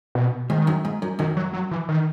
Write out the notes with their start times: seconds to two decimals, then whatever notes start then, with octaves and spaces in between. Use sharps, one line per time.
0.15 B2
0.50 G#2 D#3
0.67 F#2
0.85 G#2
1.02 F#2
1.19 F#2 D#3
1.37 F#3
1.53 F#3
1.71 E3
1.89 D#3